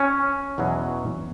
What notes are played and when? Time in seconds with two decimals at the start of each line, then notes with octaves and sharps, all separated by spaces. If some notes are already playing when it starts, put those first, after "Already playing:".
Already playing: C#4
0.58 E2 B2 F#3